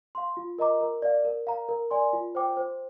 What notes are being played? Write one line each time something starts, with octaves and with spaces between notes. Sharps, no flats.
F5 C6
F4
A#4 D#5 A#5 D6
A#4
D5 F5
A#4
F5 A#5
A#4
D5 G#5 C6
F4
C5 G5 D6
C5